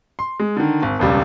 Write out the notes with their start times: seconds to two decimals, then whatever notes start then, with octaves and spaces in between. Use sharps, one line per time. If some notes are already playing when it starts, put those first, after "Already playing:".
0.19 C6
0.39 G#3
0.57 D3 D#3
0.83 G#1
0.99 E1 C#2 G3